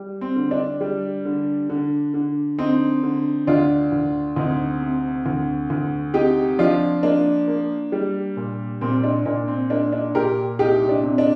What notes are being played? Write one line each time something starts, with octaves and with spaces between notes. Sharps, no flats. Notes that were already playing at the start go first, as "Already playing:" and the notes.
Already playing: G3
C4
D3
D4
G3
D3
D3
D3
D3 C4 D#4
D3
D2 D4 F4
D2
D2 C4 D#4
C3
D2
D2
C3 D#4 G4
F3 D4 F4
A#3 D4
A#3
G3
A#2
A#2 C4
D4
A#2 D4
C4
A#3 D4
D4
A#2 G4 A#4
C2 D#4 G4
D4
C3
D4